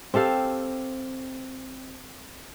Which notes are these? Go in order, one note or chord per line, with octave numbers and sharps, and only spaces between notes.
C4 G4 A4 F5